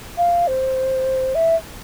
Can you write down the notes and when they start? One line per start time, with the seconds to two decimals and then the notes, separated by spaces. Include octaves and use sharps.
0.17 F5
0.47 C5
1.35 E5